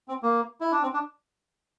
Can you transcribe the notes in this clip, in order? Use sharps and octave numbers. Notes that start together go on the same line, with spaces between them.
C4
A#3
E4
D4
C4
D4